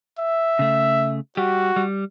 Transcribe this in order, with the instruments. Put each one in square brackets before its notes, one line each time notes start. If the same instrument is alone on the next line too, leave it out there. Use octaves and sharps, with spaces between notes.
[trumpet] E5
[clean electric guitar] C#3 A3
[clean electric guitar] G3 G4 [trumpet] F#4
[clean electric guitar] G3